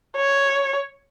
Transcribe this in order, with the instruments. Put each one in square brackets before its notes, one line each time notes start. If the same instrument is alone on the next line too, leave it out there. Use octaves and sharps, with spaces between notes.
[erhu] C#5